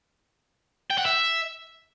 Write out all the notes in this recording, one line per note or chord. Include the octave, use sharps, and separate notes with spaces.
G5
F#5
E5